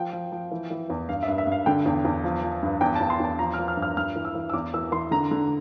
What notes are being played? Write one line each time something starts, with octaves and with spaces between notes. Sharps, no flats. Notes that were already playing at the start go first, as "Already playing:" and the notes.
Already playing: F3 G5
F3
F3
E3
E3
E2
G2 F5
E5
G2
E5
G2 F5
D3 G5
E2
E2
F3
F3
G2
E2 G5
E2 A5
C6
E2 A5
F3 A#5
F6
F3
F6
G2
F6
G2 F6
E3
E6
E3
E6
E2 D6
E3 E6
E3 C6
D3 A#5
D3